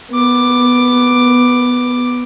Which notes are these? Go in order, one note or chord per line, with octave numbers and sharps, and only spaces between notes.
B3 D6